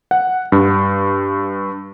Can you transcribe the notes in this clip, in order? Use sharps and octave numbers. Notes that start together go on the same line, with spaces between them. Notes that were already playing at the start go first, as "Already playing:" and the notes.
F#5
G2